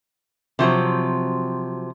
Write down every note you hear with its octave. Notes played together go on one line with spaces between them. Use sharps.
C3 F3 F#3 C4